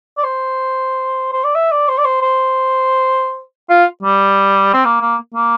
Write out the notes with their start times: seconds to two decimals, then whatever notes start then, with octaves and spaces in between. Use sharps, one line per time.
0.17 D5
0.24 C5
1.33 C5
1.44 D5
1.55 E5
1.71 D5
1.88 C5
1.98 D5
2.05 C5
2.22 C5
3.69 F4
4.02 G3
4.74 C4
4.85 A#3
5.01 A#3
5.34 A#3